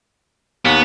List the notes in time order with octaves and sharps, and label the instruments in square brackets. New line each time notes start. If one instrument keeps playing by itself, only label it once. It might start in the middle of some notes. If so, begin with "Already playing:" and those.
[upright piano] D#2 [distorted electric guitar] B3